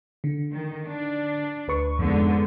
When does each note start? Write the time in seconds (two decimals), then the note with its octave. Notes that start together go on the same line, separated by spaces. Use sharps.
0.24 D3
0.53 D#3
0.87 D4
1.68 D2 B4 C#6
1.99 F2 G#2 D3 B3